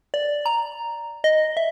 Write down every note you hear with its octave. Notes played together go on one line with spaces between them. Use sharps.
D5
A#5
D#5
E5